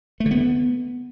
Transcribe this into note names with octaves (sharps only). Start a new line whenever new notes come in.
A3
D3
B3